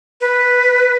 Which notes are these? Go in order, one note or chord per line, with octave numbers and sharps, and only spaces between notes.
B4